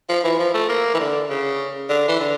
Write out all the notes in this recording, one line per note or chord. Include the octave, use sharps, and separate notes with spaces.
F3
E3
F3
A3
A#3
E3
D3
C#3
D3
E3
D3